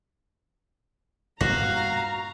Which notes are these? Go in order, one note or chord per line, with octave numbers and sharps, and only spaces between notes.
G2 A#2 B3 F#4 F5 A#5